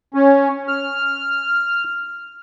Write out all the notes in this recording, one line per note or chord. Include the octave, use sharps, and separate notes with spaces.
C#4
F6